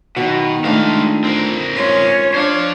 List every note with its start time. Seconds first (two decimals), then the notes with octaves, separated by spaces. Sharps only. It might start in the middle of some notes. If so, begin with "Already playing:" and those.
0.17 F#2 B2 D#3 F#4
0.65 G#3 A3 D4 F4 F5
1.24 C4 A#4
1.76 D2 G#2 C#4 F4 C#5
2.34 D4 C5 F5